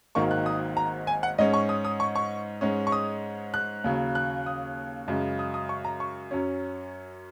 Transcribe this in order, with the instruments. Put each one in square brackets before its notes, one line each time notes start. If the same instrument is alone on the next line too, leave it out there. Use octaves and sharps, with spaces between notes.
[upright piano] G#1 G#2 D#3 F#3 A#3 C#6
F#6
D#6
A#5
G#5
F#5
G#2 G#3 C#4 D#5
C#6
D#6
D#6
C#6
C#6
G#2 G#3 C#4
C#6
D#6
F#6
D#2 C#3 F#3
F#6
D#6
F#2 C#3 G#3
D#6
D#6
C#6
A#5
C#6
F#2 F#3 C#4